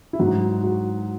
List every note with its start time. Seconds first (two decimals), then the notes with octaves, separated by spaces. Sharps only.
0.13 E4
0.19 G#2 F#3 F#4
0.63 F#4